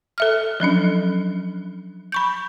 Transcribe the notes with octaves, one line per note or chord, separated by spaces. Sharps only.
A4 E5 F6
F3 F#3 C#4 D4
B5 C#6 G6